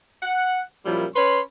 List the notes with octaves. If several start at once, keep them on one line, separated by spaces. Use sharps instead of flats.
F#5
F#2 A#2 F3 G3 E4
C#4 B4 C#5 B5 C6